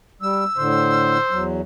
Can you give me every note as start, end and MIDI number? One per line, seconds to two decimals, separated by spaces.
0.22 0.44 55
0.22 1.44 88
0.58 1.18 45
0.58 1.18 50
0.58 1.49 72
1.30 1.61 40
1.30 1.61 54